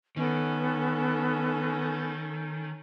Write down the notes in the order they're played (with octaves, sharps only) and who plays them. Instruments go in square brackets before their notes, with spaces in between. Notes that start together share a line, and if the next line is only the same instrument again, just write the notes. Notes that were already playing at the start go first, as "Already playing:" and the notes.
[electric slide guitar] D#3 [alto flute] B3 [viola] C#4 A4